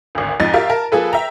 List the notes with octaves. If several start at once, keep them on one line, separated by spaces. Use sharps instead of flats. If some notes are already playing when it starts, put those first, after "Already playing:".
G#1 D2
F2 G#2 D#4 A6
F4 G4 A#4 E5 F5
A#4 A5
F3 A#3 G#4 A4 B4
E5 G5 A#5